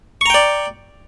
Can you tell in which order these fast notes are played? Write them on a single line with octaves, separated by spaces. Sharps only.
C#6 A#5 G5 D5